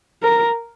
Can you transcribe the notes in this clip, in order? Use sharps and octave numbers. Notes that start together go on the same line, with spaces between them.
A#4